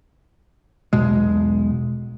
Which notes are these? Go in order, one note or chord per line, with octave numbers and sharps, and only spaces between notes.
B1 E2 B2 G#3